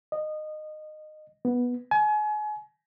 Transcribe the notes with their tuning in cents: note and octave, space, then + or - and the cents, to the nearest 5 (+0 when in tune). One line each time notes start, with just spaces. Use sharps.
D#5 -20
B3 -10
G#5 +35